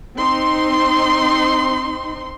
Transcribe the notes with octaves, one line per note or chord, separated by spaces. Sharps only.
C4 D#4 C6